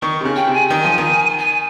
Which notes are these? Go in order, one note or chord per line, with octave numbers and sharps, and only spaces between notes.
D#3 C#6
C3
C#3
G5
C3
G#5
D#3 G5
F3 G#5
D#3
G#5